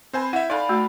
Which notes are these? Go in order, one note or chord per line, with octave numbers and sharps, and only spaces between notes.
C4 B4 C5 G5 G#5
E4 E5 F#5
D#4 A4 D5 F5 G#5 B5
A3 F#4